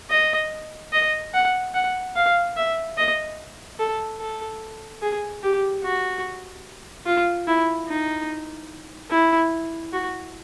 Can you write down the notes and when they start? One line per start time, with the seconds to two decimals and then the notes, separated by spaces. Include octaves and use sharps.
0.10 D#5
0.92 D#5
1.34 F#5
1.74 F#5
2.16 F5
2.56 E5
2.97 D#5
3.79 A4
4.19 A4
5.02 G#4
5.43 G4
5.84 F#4
7.06 F4
7.47 E4
7.88 D#4
9.10 E4
9.93 F#4